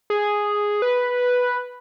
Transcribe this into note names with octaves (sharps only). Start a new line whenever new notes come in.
G#4
B4